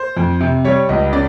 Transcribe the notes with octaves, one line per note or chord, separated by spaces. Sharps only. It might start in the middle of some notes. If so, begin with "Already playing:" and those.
Already playing: C5
F2
C3
G3 C#5
C#2 D#5
C#3 D5